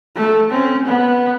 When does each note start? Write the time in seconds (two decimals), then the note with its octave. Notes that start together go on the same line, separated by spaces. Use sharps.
0.16 A3 A4
0.51 C4 C#4
0.86 B3